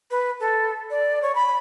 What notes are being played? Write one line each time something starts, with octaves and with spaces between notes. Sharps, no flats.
B4
A4
D5
C#5
B5